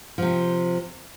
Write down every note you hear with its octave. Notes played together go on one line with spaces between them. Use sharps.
C3 F3